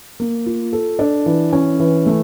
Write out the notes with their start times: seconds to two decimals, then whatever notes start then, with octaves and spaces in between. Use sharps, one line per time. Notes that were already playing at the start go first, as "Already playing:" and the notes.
0.20 A#3
0.46 F4
0.73 A4
0.99 D4
1.26 E3
1.53 C#4
1.80 E3
2.06 A3